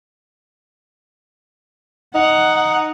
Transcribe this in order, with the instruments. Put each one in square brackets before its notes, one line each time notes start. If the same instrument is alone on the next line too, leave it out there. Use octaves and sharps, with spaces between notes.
[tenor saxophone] D#4 [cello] F#5